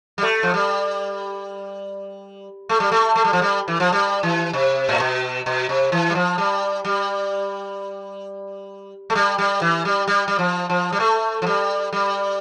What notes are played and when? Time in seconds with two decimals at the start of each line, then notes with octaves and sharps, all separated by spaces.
0.18 G3
0.23 A3
0.43 F3
0.54 G3
2.69 A3
2.80 G3
2.91 A3
3.15 A3
3.24 G3
3.33 F3
3.42 G3
3.68 E3
3.80 F3
3.92 G3
4.23 E3
4.53 C3
4.89 A2
5.00 B2
5.46 B2
5.69 C3
5.92 E3
6.10 G3
6.15 F3
6.38 G3
6.85 G3
9.10 A3
9.15 G3
9.38 G3
9.61 E3
9.85 G3
10.07 G3
10.28 G3
10.39 F3
10.69 F3
10.92 G3
11.00 A3
11.42 F3
11.47 G3
11.93 G3